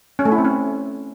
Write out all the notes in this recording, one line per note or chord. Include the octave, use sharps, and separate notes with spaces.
C#4
A3
E4
C4
C#4